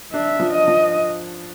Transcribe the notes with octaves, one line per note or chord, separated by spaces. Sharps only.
D4 E5
F3
D#5
F3